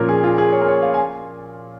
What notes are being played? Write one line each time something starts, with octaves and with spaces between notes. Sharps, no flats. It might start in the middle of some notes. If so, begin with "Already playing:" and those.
Already playing: A#2 F3 C#4 F4 A#4
G#4
F4
G#4
C#5
A#4
C#5
F5
G#5